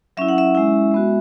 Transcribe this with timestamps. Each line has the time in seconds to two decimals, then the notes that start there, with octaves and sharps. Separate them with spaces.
0.17 F#3 C#4 E4 E5
0.28 F#5
0.38 E5
0.55 G#3 C#4 E4
0.92 G#3 B3 F#4